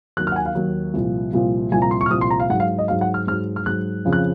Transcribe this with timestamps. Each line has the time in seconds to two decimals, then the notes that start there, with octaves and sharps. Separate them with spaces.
0.17 D#2 D#3 F#3 F#6
0.27 F6
0.32 F#5
0.36 G#5
0.46 F5
0.55 D#2 D#3 F#3
0.94 C2 A#2 F3
1.33 C2 A#2 F3
1.72 C2 A#2 F3 G#5
1.82 A#5
1.91 C6
2.01 C#6
2.06 F6
2.11 C2 A#2 F3 D#6
2.21 C6
2.30 A#5
2.40 F5
2.50 G#2 F#5
2.54 F#3
2.60 F5
2.79 D#5
2.88 G#2 F#3 F5
3.01 F#5
3.14 F6
3.27 G#2 F#3 F6
3.56 F6
3.66 G#2 F#3 F#6
4.05 F2 C#3 F3
4.13 F#6